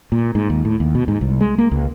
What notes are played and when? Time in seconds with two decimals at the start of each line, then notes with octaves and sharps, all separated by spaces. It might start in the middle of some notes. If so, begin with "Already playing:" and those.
0.12 A#2
0.35 G#2
0.50 D#2
0.65 A2
0.80 D#2
0.95 B2
1.08 G#2
1.21 C2
1.41 G#3
1.58 A#3
1.71 C#2